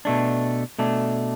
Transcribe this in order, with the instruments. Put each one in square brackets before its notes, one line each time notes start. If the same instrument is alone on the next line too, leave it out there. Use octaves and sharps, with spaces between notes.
[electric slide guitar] B2 A3 D4
B2 A3 D4